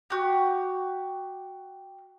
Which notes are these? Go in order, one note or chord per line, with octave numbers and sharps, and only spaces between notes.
F#4 G4